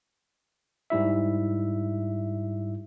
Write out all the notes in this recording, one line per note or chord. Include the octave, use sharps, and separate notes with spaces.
G#2 G3 E4 E5